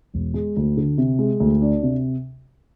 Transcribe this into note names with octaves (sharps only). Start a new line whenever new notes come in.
E1
G#3
D2
D3
C3
G#3
D2
D4
C3